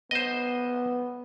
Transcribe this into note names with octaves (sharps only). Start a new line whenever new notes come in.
B3 C5 D#5